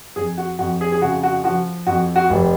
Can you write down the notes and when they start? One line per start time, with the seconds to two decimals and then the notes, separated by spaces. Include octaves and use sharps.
0.16 F2 G#4
0.38 F#4
0.59 F2 F#4
0.81 G#4
0.92 G#4
1.02 C#3 F#4
1.23 F#4
1.44 F3 F#4
1.87 F2 F#4
2.16 F#4
2.30 F1